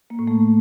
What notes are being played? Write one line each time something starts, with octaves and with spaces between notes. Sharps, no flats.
A#3
A2
A3